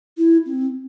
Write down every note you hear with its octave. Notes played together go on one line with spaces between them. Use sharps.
E4
C4